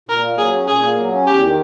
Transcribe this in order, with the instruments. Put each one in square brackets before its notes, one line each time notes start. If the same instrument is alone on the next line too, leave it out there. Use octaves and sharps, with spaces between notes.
[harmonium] A#2 [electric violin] A#4
[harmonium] A#3
[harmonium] F#3 [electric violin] G#4
[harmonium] C#4
[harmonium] A#2 [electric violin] G#4
[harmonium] A#3
F#3
C#4
[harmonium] E2 [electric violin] G4
[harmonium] D#3